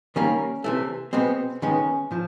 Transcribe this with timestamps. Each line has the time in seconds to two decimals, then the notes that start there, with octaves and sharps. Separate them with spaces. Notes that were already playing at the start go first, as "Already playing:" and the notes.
0.16 D#3 G3 A#3 C#4
0.64 C3 E3 A3
1.13 B2 G#3 B3 C4
1.62 D#3 G#3 B3 C#4
2.11 A2 F3